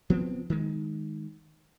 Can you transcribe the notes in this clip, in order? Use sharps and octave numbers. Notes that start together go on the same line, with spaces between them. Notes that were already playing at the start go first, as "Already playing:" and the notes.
F3 B3 C4
D#3 G#3